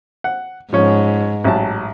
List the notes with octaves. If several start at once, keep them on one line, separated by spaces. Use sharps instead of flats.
F#5
G#2 F3 C#4
A1 F#3 A5